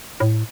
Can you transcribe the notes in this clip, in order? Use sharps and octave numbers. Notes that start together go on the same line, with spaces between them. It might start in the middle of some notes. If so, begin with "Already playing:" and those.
A2